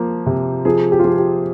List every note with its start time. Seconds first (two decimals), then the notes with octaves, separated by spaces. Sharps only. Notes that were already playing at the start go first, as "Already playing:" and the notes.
Already playing: F3 A#3
0.26 C3
0.65 F3 G#4
0.92 G4
0.99 F4
1.05 F3 G4
1.18 G4